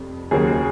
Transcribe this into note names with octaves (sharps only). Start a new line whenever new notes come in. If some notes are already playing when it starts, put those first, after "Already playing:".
Already playing: F1 F2 C3
D#2 C#3 F#3 A#3 G#4